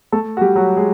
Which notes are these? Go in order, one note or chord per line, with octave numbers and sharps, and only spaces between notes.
A3 A4
F#4
G3 G4
F#3 F#4
G#3 G#4